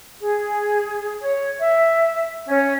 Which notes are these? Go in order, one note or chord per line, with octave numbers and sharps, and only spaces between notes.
G#4
C#5
E5
C#4